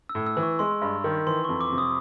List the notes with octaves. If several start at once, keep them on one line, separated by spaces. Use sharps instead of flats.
E6
A2
E6
E3
C#6
G#3 C6
G2
D#3
E3 C6
C#6
F2
D6
C3
D#6